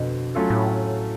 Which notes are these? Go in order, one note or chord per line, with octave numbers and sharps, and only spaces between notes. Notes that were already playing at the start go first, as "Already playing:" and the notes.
Already playing: F2 B2 D3
F#3 A3 C#4 F4 A4
A2